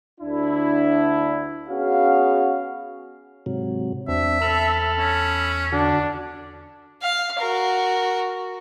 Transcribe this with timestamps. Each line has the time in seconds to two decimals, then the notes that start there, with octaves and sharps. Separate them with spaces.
0.21 D2 D4 E4
1.68 B3 C#4 F#4 G#4 F5
3.46 G#2 C3 F#3
4.08 E2 C4 D4 E5
4.42 A4 B5 E6 F6
4.98 C#4
5.72 D3 D4 F#4
7.03 F5
7.39 F#4 A#4